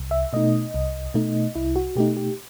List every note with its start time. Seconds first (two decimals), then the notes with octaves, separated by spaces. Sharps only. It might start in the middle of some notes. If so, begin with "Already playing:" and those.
Already playing: C2
0.11 E5
0.33 B2 A3 D#4 D#5
0.74 C2
1.14 B2 A3 D#4
1.55 C2 E4
1.76 F#4
1.96 B2 A3 D#4 G4
2.17 G4